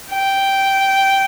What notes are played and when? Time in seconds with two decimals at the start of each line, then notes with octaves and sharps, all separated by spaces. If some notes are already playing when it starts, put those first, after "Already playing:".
0.10 G5